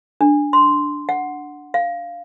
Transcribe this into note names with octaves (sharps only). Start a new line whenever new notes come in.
D4
C6
F#5
F5